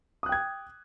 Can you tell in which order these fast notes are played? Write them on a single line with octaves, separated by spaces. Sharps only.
D#6 F#6 G5 G#6